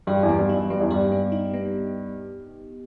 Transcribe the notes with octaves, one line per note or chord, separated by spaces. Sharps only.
G2 G4
E2
B3
G2
G2 D#4
G2 B3
E2
G2 G4
B3
D#4
B3